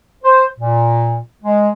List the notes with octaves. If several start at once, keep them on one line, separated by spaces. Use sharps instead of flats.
C5
A#2
G#3